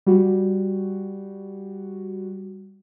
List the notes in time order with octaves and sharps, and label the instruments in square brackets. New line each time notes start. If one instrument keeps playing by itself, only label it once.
[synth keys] G3 F#4